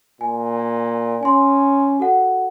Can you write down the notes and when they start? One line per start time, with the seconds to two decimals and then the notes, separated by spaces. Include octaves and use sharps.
0.21 A#2 G#5
1.23 C#4 G#5 C6
2.00 F#4 A4 F#5